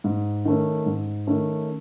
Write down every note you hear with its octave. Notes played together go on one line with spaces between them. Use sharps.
G#2
D#3 A3 C#4
G#2
D#3 A3 C#4